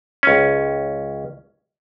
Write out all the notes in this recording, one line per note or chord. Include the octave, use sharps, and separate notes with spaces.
C#2 C#4